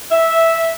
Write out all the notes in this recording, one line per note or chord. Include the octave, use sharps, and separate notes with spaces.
E5